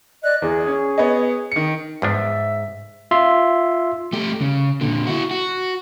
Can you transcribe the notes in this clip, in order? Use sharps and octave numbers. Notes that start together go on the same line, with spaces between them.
D5 D#5 F#6
E2 G#4
C#4
B3 C#5 D#5
D#3 C#7
E2 G#2 F3 D4 E5
F4 E5 C6
A3 G4
C#3
A#2 D3
E4 F#4
F#4